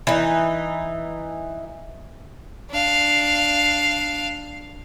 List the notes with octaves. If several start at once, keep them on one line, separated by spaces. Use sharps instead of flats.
E3 D#4
D4 F5